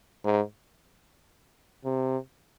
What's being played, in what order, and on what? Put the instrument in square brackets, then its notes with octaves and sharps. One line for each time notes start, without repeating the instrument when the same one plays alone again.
[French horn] G#2
C3